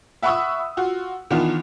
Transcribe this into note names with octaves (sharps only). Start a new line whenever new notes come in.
E5 F#5 B5 C#6 D#6 E6
F4 F#4
D#3 E3 B3 D4 F4